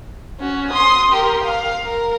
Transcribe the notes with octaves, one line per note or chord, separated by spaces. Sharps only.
C#4 F#4
C6 D#6
G4 A#4
F5
A#4